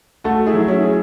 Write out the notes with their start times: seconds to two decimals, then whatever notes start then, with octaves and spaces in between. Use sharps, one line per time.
0.24 A3 F#4 A4
0.47 E4 G#4
0.54 F#3
0.68 C#4 E4
0.83 G#4